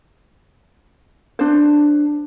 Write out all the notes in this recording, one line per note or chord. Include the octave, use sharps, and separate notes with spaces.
D4 C5